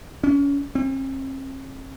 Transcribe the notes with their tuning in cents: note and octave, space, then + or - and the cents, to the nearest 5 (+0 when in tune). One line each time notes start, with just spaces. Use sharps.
C#4 +30
C4 +45